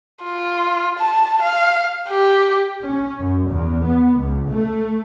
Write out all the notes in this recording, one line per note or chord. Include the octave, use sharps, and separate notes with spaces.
F4
A5
F5
G4
C#4
F#2
E2
B3
C#2
A3